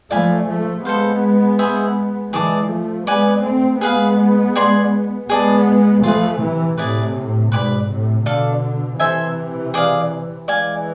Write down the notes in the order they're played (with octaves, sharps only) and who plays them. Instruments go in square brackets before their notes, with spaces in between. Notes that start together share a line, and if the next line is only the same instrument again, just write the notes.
[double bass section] F3 A3 [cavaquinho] D5 F5 G#5 B5
[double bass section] F3 A3
[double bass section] G#3 B3 [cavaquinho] A4 C5 F5
[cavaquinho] G#4 C5 E5
[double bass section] E3 G#3 [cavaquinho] G#4 D5 A5 D6
[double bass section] F3 A3
[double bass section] G#3 B3 [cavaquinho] B4 D5 G#5
[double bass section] A3 C4
[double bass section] G#3 B3 [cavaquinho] G#4 B4 F5
[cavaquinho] G#4 D5 G#5 C6
[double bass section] G#3 B3 [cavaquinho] G#4 D5 A5
[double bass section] F3 A3 [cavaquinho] F4 G#4 B4
[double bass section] C3 E3
[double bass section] A2 C3 [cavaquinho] E4 G#4 B4 D5
[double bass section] G#2 B2 [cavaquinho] B4 D5 G#5 B5
[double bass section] A2 C3
[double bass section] B2 D3 [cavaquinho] A4 D5 F5
[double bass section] C3 E3 [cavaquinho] A4 C5 E5 G#5
[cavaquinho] G#4 D5 F5
[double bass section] E3 G#3 [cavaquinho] D5 F5 G#5